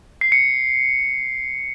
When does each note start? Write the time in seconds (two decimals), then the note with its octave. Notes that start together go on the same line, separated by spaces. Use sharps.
0.21 C7
0.32 C#7